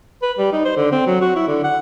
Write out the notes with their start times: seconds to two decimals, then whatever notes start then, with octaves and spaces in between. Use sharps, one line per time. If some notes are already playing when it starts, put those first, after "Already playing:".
0.22 B4
0.38 G3
0.52 D#4
0.65 C5
0.76 D3
0.92 C4
1.06 F#3
1.21 F#4
1.36 E4
1.47 D3
1.64 F#5